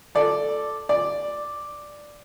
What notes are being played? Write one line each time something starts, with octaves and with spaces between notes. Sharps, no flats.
A4 D5
D5